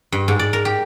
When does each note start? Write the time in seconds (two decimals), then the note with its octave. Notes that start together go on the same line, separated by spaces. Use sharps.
0.12 G2
0.28 G#2
0.39 D5
0.53 A#4
0.65 G4